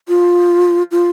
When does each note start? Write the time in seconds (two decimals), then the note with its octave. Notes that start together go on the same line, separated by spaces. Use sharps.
0.08 F4
0.91 F4